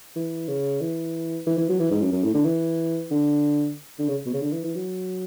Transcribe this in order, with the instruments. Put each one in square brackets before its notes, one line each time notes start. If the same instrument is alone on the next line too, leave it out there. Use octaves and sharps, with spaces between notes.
[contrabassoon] E3
C#3
E3
E3
E3
F#3
E3
G#2
F#2
F#2
A2
D3
E3
D3
D3
C#3
B2
C#3
D3
E3
E3
F#3